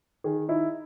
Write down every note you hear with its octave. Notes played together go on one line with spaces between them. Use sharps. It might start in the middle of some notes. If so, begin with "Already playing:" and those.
D#3 G#4
D#4 E4